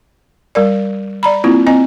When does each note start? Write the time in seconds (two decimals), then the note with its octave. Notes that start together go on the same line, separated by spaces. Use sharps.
0.55 G3 A#4 D5
1.23 D5 A#5 B5
1.44 A#3 C4 E4 F4
1.67 C4 D#5 G#5